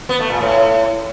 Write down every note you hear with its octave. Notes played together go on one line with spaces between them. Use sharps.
B3
A3
A#2
A2